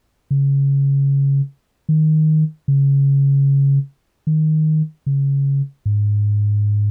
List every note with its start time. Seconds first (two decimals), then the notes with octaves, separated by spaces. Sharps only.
0.31 C#3
1.89 D#3
2.68 C#3
4.27 D#3
5.06 C#3
5.86 G#2